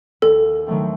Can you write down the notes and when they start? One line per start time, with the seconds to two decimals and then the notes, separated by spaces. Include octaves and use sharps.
0.22 D#2 A4
0.66 D#3 F#3 A3 C4